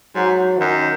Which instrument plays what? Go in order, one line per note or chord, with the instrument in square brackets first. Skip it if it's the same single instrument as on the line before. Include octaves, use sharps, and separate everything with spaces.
[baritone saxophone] G#2 [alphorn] F#3
[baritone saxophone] F#2 [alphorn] D#3